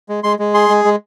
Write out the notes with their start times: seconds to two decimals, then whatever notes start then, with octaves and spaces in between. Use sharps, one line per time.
0.09 G#3
0.24 G#3 C6
0.39 G#3
0.54 G#4 C6
0.69 G#3
0.85 G#3